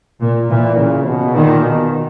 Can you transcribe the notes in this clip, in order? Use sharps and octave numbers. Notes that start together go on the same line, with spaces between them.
A#2
A#2 E3
C#3
B2
A#2 D#3
B2